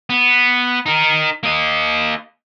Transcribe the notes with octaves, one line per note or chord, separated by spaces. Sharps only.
B3
D#4 A#4
A#3 D#5